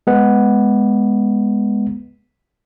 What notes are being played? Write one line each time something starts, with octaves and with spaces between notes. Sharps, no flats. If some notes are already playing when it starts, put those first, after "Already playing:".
G#3 B3